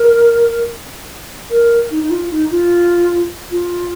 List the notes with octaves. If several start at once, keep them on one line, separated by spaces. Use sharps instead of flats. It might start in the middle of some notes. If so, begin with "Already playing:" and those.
Already playing: A#4
A#4
D#4
D#4
F4
D#4
F4
F4